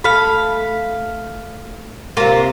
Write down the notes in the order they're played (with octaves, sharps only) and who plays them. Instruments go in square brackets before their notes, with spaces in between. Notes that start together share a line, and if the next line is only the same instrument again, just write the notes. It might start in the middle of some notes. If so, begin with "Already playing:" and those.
[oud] A3 [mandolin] F5 B5
[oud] C3 A#3 [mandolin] F4 A#5